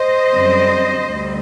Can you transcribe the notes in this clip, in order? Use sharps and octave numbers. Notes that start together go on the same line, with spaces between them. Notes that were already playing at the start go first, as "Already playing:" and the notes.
Already playing: C5 D#5
F#2 D3 G3 C4
D2 D3 G3